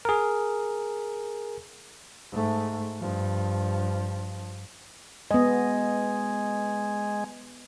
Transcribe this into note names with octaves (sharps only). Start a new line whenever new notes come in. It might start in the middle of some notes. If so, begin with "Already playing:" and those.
G#4 A#4
G#2 A3
G2 F3
G#3 B3 D#5